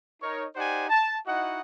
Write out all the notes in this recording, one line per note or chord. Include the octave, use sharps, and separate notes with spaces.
D#4 A#4 C#5
D#4 G4 C5 D5 F#5 G#5
A5
D#4 E4 F#4 D#5 F#5